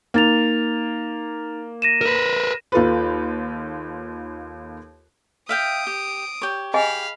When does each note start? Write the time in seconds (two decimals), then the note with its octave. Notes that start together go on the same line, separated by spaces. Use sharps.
0.14 A#3 D#4 A6 F7
1.82 A#6 D#7 E7
2.01 A#4 B4
2.72 D#2 F4 A4 B4
5.49 E5 F5 G5 D#6 D7
5.87 G4
6.42 G4 C#5
6.74 G#4 D#5 F5 G#5 B5